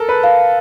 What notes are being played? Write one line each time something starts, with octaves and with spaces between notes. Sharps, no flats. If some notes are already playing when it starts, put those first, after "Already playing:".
Already playing: A4 A#4
B4
F5